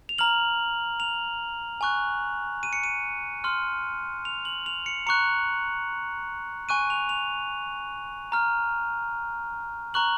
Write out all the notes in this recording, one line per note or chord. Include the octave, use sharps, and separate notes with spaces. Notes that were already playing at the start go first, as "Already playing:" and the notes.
F7
A#5 F6 F#7
F7
G#5 C#6 F#6
D#7
C#7
D#7
C6 F6
F7
F#7
F7
C#7
A#5 C#6 F#6 C#7
G#5 C#6 F#6 D#7
F7
F7
A#5 F6
A#5 C#6 F#6 F#7